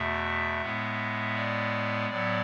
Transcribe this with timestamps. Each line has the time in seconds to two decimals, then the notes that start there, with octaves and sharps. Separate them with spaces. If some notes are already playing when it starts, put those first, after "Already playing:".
Already playing: E2 B2 A3 E5
0.61 A2 G#3 B3
1.36 D5
2.10 A2 F#3 B3 D5